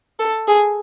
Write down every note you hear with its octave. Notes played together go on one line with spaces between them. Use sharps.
A4
G#4